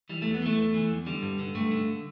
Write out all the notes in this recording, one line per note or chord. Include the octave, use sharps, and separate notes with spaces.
E3 G3
A3
E2
B3
E3 A3
E2
E3
E2
D3 G3
G2
D3
G2 A3
D3